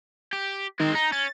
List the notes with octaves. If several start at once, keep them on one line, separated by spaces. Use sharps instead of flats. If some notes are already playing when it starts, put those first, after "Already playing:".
G4
D#3 G#3 C4
D#4 A#5
C#4 A6